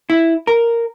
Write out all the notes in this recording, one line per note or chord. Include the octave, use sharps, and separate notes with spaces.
E4
A#4